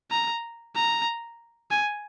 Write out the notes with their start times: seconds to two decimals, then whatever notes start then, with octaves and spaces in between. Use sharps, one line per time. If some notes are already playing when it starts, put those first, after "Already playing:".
0.11 A#5
0.75 A#5
1.71 G#5